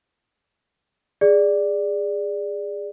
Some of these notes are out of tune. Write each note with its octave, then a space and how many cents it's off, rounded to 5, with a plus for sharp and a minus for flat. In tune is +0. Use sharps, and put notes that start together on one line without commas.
G#4 -15 D5 +0